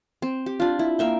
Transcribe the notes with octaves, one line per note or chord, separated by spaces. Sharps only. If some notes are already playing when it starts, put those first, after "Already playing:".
C4
G4
D4 F4
E4
A#3 E5 G5